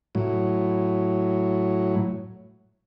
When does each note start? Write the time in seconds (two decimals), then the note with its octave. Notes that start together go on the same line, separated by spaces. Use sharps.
0.15 A2 F#3